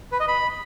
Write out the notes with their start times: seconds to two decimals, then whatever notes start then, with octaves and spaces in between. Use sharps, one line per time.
0.12 B4
0.20 D#5
0.28 B5